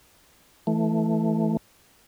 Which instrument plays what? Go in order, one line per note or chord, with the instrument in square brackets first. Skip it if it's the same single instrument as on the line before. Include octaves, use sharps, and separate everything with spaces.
[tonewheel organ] E3 A3